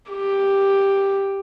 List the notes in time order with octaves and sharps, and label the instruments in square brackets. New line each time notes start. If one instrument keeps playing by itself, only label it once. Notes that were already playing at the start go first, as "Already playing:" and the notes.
[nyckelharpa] G4